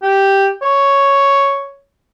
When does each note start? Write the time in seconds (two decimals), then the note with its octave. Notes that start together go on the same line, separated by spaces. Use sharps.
0.03 G4
0.63 C#5